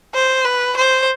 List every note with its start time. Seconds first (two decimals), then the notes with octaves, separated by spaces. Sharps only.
0.14 C5
0.45 B4
0.77 C5